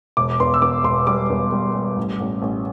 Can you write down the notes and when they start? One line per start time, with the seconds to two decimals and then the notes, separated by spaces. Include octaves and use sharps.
0.17 E1 D6
0.40 E2 C6
0.54 E6
0.62 E2 D6
0.84 E1 C6
1.07 G3 D6
1.30 E2
1.52 G3
1.75 G3
1.97 A1
2.20 A1
2.42 A1